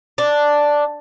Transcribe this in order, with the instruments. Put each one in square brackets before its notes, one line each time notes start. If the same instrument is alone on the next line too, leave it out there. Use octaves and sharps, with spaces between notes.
[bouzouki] D4